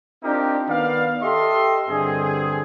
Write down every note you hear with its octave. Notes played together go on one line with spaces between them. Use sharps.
C4 D4 D#4 F4 G4 A#4
D#3 B3 D5 F5
G4 A4 D#5 E5 C6
G2 D3 C4 G#4